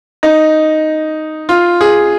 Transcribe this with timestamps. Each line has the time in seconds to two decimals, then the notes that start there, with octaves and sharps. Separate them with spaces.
0.23 D#4
1.49 F4
1.81 G#4